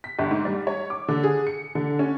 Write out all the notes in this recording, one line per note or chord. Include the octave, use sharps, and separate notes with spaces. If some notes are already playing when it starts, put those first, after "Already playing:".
B6
G1
G#2
G3
C#5
D6
D3
G#4
C#7
D3
C#4